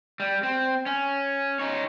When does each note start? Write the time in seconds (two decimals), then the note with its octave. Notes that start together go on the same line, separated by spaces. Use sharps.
0.20 G3
0.43 C4
0.86 C#4
1.59 D#4 C#5